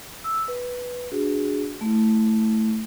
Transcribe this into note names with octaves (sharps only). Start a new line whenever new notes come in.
E6
B4
D4 F#4 G#4
A3 E4